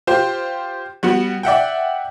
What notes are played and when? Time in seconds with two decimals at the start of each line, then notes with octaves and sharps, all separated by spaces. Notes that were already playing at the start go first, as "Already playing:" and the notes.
0.07 F4 G4 C5
1.03 G3 B3 F#4
1.43 D5 E5 F#5 G5